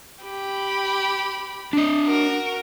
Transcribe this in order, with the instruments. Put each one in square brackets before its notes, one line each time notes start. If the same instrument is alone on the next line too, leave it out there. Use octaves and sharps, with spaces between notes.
[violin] G4 B5
[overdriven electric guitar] D4 D#5
[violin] F#4 A#4